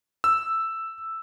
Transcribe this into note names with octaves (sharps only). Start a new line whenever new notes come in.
E6